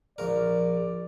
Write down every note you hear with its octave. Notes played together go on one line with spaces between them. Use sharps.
A#1 A#4 D5